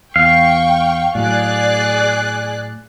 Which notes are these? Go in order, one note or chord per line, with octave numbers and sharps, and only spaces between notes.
E2 F5 G5 C#6
A2 F#3 G#4 D5 F#6